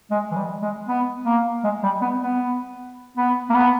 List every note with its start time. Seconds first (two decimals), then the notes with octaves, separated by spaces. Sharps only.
0.11 G#3
0.31 E3
0.36 G3
0.62 G#3
0.88 B3
1.25 A#3
1.64 G#3
1.83 G3
2.01 B3
2.22 B3
3.17 B3
3.50 A#3
3.54 B3